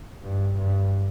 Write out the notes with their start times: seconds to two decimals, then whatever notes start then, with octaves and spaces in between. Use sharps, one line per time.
0.22 G2
0.57 G2